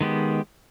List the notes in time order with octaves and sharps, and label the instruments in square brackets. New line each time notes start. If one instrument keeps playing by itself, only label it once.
[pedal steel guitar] D#3 G#3 B3 G4